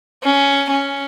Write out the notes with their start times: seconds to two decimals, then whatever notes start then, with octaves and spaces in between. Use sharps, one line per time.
0.23 C#4
0.71 C#4